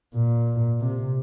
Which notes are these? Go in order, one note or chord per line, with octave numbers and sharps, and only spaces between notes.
A#2
C3